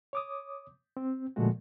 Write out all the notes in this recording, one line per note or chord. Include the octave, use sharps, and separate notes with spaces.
C#5 D6 D#6
C4
A#2 D3 F3 G#3 A3 F#4